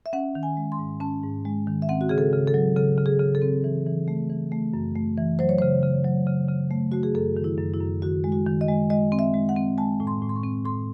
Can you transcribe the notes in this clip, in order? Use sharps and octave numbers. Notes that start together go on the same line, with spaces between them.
E5
C#4 F#5
D#3
G#5
G#3
C6
G#2
C#4 A5
G#2
G#3
D#3
E5
C4 F#5
F#4
C#3 G#4
A4
C#3
A4
F#3
C#3 A4
C#3
G#4
C#3
A4
C4
E3
E3
A3
E3
A3
F#2
A3
E3
F#3 C5
C#5
C#3 C5
C#3
F#3
C#3
C#3
A3
A3 F#4
G#4
F#2 A4
D#3
E4
F#2
E4
F#2
D#3 F#4
G#3
F#4
D#3
D#5
G#3
G#3 D#5
C4
E5
G#3
F#5
C4
G#3 A5
A2
C6
A2
C6
C#6
C4
A2 C6